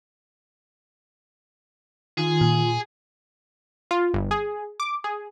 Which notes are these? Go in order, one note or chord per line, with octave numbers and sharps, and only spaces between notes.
D#3 F4 G#4
A#2
F4
G1
G#4
D6
G#4